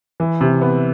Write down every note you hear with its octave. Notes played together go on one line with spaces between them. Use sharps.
E3
C3
B3